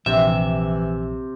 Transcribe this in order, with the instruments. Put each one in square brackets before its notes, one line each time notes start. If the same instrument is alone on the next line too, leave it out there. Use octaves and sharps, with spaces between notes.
[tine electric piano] A#1 [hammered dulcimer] C3 [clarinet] E3 [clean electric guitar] E5